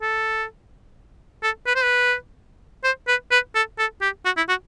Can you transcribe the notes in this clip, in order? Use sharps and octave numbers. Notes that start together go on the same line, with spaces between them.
A4
A4
B4
C5
B4
C5
B4
B4
A4
A4
G4
F#4
E4
F#4